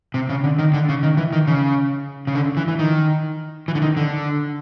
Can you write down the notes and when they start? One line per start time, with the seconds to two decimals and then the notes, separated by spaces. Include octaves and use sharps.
0.14 C3
0.29 C#3
0.44 D3
0.59 D#3
0.74 D3
0.89 C#3
1.03 D#3
1.17 E3
1.33 D#3
1.47 C#3
2.27 C#3
2.35 D3
2.57 E3
2.68 E3
2.79 D#3
3.68 E3
3.75 D3
3.82 D#3
3.97 D3